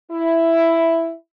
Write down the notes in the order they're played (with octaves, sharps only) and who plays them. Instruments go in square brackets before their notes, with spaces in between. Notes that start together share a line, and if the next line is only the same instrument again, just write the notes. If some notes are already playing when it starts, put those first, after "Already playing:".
[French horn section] E4